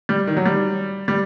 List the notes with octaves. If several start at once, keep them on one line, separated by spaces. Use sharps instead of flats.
G3
D#3
F#3
G3
G3